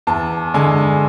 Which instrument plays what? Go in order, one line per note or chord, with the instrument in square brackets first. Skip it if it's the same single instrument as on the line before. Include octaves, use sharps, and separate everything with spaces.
[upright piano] E2 A5
D3 G#3 G#5